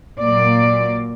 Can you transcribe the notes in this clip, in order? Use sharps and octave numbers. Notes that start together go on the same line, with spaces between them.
A#2 F#3 A#3 D5